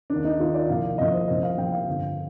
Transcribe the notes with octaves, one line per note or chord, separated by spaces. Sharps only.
D#3 D4
D#2
D#4
D#2 D#3 F4
D5
C2 A#2 F3 F5
C2 A#2 F3 D#5
C5
C2 A#2 F3 D#5
F5
C2 A#2 F3 G5
F5
G1 F2 D3